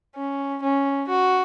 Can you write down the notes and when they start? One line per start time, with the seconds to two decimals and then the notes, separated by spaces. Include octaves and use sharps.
0.16 C#4
0.63 C#4
1.09 F#4